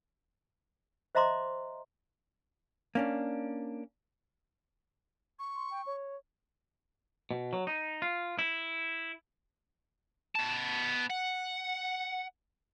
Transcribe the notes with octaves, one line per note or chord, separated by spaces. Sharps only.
C5 D#5 E5 A#5 C6 D6
A#3 C#4 D4
C#6
C6
G5
C#5
B2
F#3
D#4
F4
E4
B3 A5
F#5